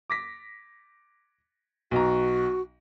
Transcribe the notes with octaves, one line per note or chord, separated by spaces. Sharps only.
D6 A#6 B6
B1 F#4 A#5